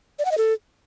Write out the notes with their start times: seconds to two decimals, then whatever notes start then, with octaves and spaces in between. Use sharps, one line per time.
0.19 D5
0.25 F#5
0.31 D#5
0.38 A4